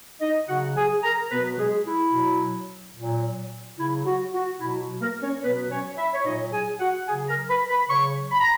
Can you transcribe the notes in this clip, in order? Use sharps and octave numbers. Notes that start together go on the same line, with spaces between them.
D#4 D#5
C#3 F#3 F#4 F#5
G#4 G#5
A#4 A#5
B2 F#3 B3 B4
G#3 G#4
E4
B2 F#3
A#2 F#3
C#3 F#3 E4
F#4
F#4
B2 F#3 E4
F#4
A#3 A#4
C#4 C#5
B2 F#3 B3 B4
C#4 C#5
E4 E5
C#5
A#2 F#3 D#4 D#5
G#4 G#5
F#4 F#5
C#3 F#3 G#4 G#5
A#4 A#5
B4 B5
B4 B5
C#3 F#3 C#5 C#6
B5
A#5